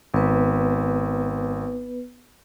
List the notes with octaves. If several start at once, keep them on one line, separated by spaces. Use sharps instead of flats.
G#1 B3 B4